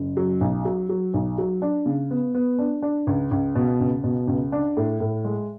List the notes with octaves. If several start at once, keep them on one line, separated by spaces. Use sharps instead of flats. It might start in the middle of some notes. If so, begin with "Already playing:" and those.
Already playing: F#1
F#3
B1
F#3
F#3
B1
F#3
D4
C#3
B3
B3
D4
D4
C#2
C#2
B2
C#2
B2
C#2
D4
A2
A2
G#3